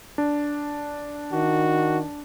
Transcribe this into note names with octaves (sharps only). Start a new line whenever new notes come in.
D4
D#3 F#4